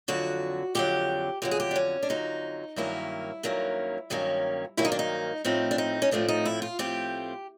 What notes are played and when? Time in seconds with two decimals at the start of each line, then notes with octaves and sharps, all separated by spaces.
0.08 F2 D3 F#3 F#4
0.75 F2 D3 F#3 G4
1.42 F2 D3 F#3 G4
1.51 G#4
1.60 G4
1.71 D4
1.76 C#4
2.03 D4
2.09 F2 D3 F#3 D#4
2.76 G2 D#3 F#3 A#3 C#4 E4
3.43 G2 D#3 F#3 A#3 C#4
4.10 G2 D#3 F#3 A#3 C#4
4.77 G2 D#3 F#3 A#3 C#4 E4
4.85 D#4
4.92 D4
4.99 D#4
5.45 A2 F3 A3 C4 D#4
5.71 D4
5.78 D#4
6.02 C#4
6.11 A2 F3 A3 C4 D4
6.28 D#4
6.45 E4
6.62 F4
6.79 A2 F3 A3 C4 G4